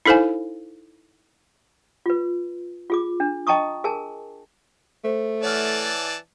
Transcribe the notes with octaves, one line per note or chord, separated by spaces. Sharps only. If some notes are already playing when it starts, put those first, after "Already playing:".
D#4 E4 A4 C5 F5 G#5
F4 B4
F4 G#4 D6
D4
D#5 G5 A5 A#5 C#6 D#6
G#4 A#4 G#5 A5
A3 A4 C5
E3 C#5 D5 F#5 A5 F6